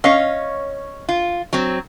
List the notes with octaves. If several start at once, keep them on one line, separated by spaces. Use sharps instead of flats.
C#4 C#5 D#5 F5
F4
F#3 C4